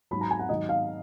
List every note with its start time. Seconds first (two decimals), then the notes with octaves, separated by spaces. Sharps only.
0.11 G#2 F#3 B5
0.21 A#5
0.31 G#5
0.39 F#5
0.49 G#2 D#3 F#3 D#5
0.69 F5